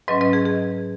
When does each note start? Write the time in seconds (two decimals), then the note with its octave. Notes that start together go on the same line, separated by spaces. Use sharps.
0.08 G#2 F#3 C#4 B4 D#5
0.21 B4 D#5
0.33 G#4
0.45 G#4